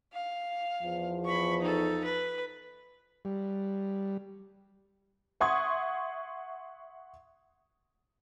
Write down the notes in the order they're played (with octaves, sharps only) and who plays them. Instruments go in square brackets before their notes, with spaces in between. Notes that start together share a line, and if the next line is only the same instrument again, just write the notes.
[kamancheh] F5
[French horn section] E2 F3
[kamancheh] B5 C#6
D#4 A4
B4
[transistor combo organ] G3
[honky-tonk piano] E5 F#5 C6 C#6 D#6 G#6